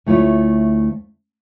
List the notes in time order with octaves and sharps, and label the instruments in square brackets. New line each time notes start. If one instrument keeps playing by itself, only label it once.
[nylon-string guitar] D2 A3 E4 F4 C#5